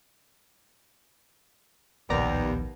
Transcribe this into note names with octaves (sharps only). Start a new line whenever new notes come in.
D1 A#1 D#2 D#3 B3 D5 A#5